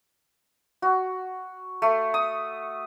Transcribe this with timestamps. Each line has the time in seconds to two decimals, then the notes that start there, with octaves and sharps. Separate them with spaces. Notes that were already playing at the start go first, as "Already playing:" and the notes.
0.82 F#4
1.82 A3
2.14 D#6